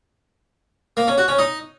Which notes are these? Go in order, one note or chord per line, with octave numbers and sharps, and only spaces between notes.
A#3
C#4
F#4
C#4
D#4